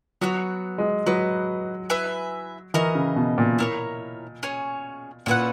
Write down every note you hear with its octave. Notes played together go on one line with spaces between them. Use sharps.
F#3 B3 F#4 C#5
G#3
F#3 F#4 B4 D#5
E4 B4 E5 G#5
E3 F#4 A#4 D#5
C#3
B2
A#2
E4 A#4 C#5
C#4 G#4 C#5
A#2 C#4 E4 B4 F#5